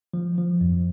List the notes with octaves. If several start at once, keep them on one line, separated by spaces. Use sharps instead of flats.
F3
F3
F2